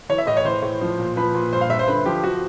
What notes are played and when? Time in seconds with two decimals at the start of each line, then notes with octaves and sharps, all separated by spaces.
0.09 E3 C#5
0.18 E5
0.27 A2 D#5
0.37 C#5
0.45 E3 C5
0.62 A2
0.81 F3
0.99 A#2
1.16 F3 B4
1.34 A#2
1.53 G2 C5
1.61 F5
1.69 G2 E5
1.79 C5
1.88 D3 B4
2.05 F3 G4
2.24 F3 F#4